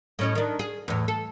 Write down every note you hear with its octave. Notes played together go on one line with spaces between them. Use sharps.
A2 C#4 D#5
D#3 D4
G#4
E2 A2
A4